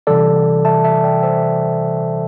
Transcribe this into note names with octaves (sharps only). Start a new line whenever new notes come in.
C3 E3 G3 A4 D5
E5 A5
E5 A5
E5
D5 G5
C5 E5